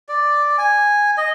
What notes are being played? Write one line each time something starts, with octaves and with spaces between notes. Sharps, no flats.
D5
G#5
D#5